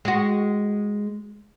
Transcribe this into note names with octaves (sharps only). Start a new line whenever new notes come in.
G#3 F#4